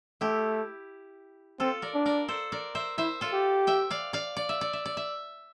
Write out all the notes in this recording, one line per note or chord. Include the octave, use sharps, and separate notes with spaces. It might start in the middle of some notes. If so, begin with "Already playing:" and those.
A3 E4 G4
C4 F4 A4
A#4 D5
D4
A#4 D5
A4 C5
A#4 D5
C5 E5
E4 C5 E5
F4 A4
G4
E5 G5
D5 F5
D5 F5
D5
E5
D5
E5
D5
E5